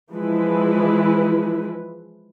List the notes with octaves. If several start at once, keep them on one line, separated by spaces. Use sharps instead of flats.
E3 F3 G#3 E4 B4